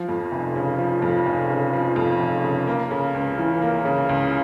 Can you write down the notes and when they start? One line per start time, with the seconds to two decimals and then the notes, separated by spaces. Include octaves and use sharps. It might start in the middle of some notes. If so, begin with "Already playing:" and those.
Already playing: F3
0.09 F2
0.32 F1
0.56 C#3
0.79 F3
1.02 F2
1.26 F1
1.49 C#3
1.73 F3
1.96 F2
2.20 F1
2.44 C#3
2.67 A#3
2.91 C#3
3.14 C#2
3.38 E3
3.62 A#3
3.85 C#3
4.09 C#2